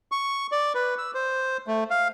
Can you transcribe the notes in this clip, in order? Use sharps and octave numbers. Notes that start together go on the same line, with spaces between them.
C#6
D5
B4
E6
C5
A3
F5